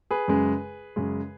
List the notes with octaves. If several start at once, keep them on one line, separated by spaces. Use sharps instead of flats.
G#4 B4
F#2 C#3 G#3
F#2 C#3 G#3